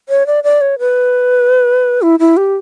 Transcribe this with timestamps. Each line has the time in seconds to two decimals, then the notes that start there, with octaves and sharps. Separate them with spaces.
0.09 C#5
0.27 D5
0.44 D5
0.61 C#5
0.79 B4
2.02 E4
2.20 E4
2.37 G4